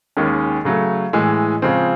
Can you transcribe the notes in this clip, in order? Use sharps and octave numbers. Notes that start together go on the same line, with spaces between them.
D#2 D#3 G#3 C#4
C#3 F#3 A3
A2 E3 G#3
C#3 F3 G#3 C4